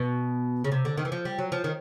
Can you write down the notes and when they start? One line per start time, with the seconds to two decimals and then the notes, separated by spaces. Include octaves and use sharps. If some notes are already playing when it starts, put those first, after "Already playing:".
Already playing: B2
0.64 C#3
0.72 C3
0.85 D3
0.98 D#3
1.05 E3
1.12 F3
1.25 G3
1.39 F#3
1.52 F3
1.64 D#3